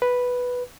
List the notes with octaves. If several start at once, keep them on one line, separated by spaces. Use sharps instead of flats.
B4